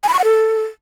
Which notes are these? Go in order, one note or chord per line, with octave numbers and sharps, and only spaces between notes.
G#5
B5
C#6
F#5
A4